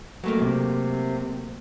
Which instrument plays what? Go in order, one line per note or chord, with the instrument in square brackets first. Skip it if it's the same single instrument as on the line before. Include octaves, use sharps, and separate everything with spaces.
[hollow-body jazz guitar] F#3 A3 A#3
[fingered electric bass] C3